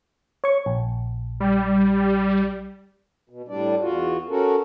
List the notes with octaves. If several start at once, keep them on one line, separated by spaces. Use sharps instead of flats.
C#5 C#6
A#1
G3
B2
A2 G3 D4 D5
E2 F4 F#4
C#4 F#4 A4 A#4